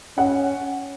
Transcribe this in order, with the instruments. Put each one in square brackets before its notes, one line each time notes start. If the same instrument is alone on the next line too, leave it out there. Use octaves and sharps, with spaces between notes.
[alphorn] C#4 [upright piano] F#5